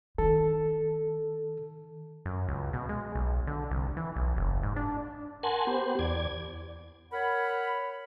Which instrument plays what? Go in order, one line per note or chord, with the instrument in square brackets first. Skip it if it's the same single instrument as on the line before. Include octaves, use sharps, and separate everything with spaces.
[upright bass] D#3 [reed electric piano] A4
[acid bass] F#2
C#2
B2
G#3
B1
D3
C2
E3
B1
F#1
G#2
D4
[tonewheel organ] A#4 F#5 G#5 A5 C6
B3 G4 C5
E2 D5 G#6
[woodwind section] A#4 C#5 F#5 B5